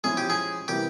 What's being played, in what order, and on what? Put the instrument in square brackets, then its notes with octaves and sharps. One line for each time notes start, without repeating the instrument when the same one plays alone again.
[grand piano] F3 G#3 C#4 E4 [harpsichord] G#4
[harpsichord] G4
G#4
[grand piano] C3 E3 G3 A#3 [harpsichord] G4